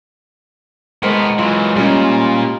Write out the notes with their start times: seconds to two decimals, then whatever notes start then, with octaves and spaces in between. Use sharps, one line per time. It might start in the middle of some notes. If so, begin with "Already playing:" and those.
1.03 A2 G#3 B3 A#4 C5
1.39 E3 F#3 F4
1.76 A#2 G3 C#4 F4 A#4 D#5